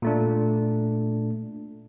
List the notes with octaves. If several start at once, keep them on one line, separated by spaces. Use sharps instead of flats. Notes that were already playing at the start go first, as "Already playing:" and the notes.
A#2 A3 D4